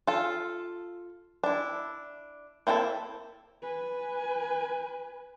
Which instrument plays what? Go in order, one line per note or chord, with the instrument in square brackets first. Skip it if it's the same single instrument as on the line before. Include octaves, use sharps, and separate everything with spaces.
[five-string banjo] F4 A4
D4 E4
A#3 C4 E4 F#4 A4
[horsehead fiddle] B4 G#5